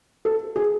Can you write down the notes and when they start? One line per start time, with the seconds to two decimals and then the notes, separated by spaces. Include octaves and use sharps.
0.25 A4
0.56 G#4